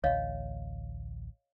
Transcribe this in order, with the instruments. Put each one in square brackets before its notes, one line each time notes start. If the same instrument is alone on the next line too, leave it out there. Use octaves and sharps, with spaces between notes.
[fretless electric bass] A1 D2 [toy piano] C#5 D#5 F5